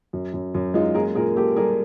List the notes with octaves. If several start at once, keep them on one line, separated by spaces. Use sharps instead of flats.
F#2
F#2
F#2
G#3 D#4 F4
A#3 G#4 A#4
A#2 G#4 A#4
A#3 G4 A4
G3 G#4 A#4